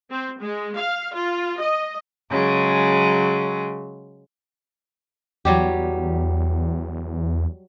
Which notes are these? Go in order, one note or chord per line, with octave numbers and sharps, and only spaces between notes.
C4
G#3
F5
F4
D#5
C#3 F#3 G#3
E2 F#3 G3 G4